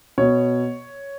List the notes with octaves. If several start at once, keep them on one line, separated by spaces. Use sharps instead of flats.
B2 C#5